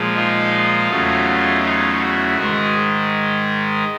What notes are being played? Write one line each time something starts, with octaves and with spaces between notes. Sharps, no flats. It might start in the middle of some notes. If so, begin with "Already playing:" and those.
Already playing: A#2 F3 G#3
D#4 F4
E2 C#3 F#3 A3
D#4 F4
E4 F#4
G#2 D#3 G#3 F#4 G#4